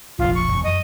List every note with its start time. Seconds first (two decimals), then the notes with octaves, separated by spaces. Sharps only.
0.19 F1 A#1 F4
0.35 C#6
0.48 E1 D2
0.64 F#2 D#5